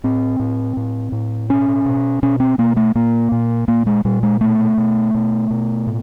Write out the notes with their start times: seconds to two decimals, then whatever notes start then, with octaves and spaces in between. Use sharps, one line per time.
0.04 A2 C4
0.40 A2
0.77 A2
1.12 A2
1.49 B2 C#4
1.86 B2
2.23 B2 C#4
2.40 C4
2.58 B2 A#3
2.77 A3
2.95 A#2 A#3
3.32 A#2
3.68 A#2 A#3
3.86 G#3
4.05 A#2 G3
4.23 G#3
4.41 B2 A3
4.78 B2
5.14 B2
5.51 B2
5.87 A2